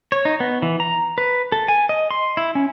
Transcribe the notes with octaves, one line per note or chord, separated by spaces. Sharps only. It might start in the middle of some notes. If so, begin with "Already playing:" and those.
C#5
D#4
B3
E3
A#5
B4
A4
G#5
D#5
C6
E4
C#4